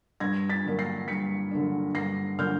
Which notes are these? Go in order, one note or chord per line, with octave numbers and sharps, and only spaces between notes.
G2 G#6 A#6
A6 B6
D3 F#3 A#3 D4
A#6 C7
G2 B6 C#7
D3 F#3 A#3 D4
G2 A#6 C7
D3 F#3 A#3 D4 F6 G6